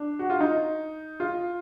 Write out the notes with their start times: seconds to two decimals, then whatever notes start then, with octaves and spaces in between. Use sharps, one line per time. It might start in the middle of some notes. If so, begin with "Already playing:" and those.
Already playing: D4
0.19 F#4
0.30 F4
0.40 D#4
1.20 F4